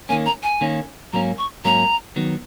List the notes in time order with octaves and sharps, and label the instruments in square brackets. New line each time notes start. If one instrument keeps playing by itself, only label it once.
[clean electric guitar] D#3 A#3 C#4 [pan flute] G#5
[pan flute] A#5
G#5
[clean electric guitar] D#3 A#3 C#4
[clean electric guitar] G#2 F#3 A#3 C#4 [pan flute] A#5
[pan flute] C#6
[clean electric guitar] G#2 F#3 A#3 C#4 [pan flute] A#5
[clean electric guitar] D#3 F#3 B3